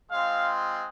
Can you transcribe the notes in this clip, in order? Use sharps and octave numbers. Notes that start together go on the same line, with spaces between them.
G#3 C4 F4 F5